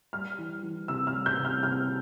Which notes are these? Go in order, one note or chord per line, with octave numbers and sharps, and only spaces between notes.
G3 F6
E3
E3
C3 E6
F6
G3
G6
C3
F6
C3 F6